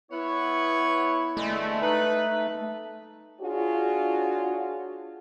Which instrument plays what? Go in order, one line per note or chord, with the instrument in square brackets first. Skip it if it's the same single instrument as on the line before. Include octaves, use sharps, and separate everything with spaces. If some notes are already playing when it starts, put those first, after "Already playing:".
[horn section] B3 C#5 [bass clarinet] E4
[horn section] B2 D3 G#3 [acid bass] A3
[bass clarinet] D#4 [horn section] B4
[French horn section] D4 F4 F#4 G#4 C#5